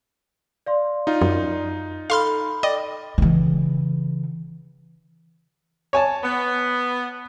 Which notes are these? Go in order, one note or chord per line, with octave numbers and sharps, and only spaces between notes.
D5 F5 C6
D#4 F4
F#2
A4 F5 B5 C6 F6
D5 D#5 G5
C#3 E3
C#5 G#5 A5
B3